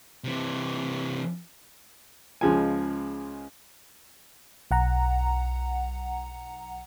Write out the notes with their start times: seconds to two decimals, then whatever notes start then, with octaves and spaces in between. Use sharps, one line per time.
0.24 C3 E3
2.41 C#2 C#3 F3 G#3 G#5
4.71 B1 F#5 A#5